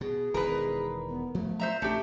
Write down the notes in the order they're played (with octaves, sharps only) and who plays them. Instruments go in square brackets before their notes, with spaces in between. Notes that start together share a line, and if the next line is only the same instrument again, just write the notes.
[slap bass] B2 [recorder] G#4
[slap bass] E1 D#3 E3 [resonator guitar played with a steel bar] A#4 B4
[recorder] B3
[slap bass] F3 F#3 [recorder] A3
[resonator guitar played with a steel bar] C5 E5 A#5
[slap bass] A1 D4 [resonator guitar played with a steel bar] A3 G4 [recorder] E5